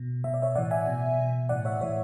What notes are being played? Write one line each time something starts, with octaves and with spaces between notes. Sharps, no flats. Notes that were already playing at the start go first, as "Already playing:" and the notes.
Already playing: B2
B2 E5
D5
C#5 E5
A2 E3 D5 F#5
E5 G#5
B2
B2
A2 E3 D5 F#5
C#5 E5
A2 E3 C#5 E5